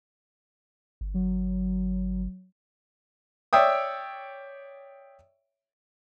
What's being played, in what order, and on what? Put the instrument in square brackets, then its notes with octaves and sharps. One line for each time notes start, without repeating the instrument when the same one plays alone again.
[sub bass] G1
[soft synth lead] F#3
[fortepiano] C#5 D5 E5 G5 D#6